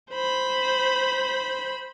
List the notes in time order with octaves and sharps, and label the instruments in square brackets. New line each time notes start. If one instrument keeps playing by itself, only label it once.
[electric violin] C5 B5